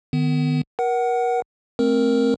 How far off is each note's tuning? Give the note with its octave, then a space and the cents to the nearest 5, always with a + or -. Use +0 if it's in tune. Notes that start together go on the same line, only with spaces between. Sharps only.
D#3 -30 B3 +25
A#4 +30 F#5 +15
A3 +0 C4 +10 A#4 +0